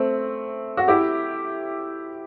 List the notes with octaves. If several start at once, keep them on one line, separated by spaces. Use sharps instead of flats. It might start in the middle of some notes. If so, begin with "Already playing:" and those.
Already playing: A3 C4
F#4
E4 G4